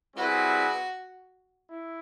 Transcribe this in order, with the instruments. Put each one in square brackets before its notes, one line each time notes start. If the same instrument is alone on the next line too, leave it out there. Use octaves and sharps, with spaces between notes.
[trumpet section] G3 C4 E4 G#4 B4 [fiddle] F#4
[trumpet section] E4